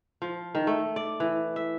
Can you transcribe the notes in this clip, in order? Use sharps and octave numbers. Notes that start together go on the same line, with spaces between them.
F3
D#3
A3
D5
E3
E5